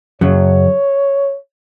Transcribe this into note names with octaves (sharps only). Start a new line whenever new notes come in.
F#2 C#3 F#3 C#5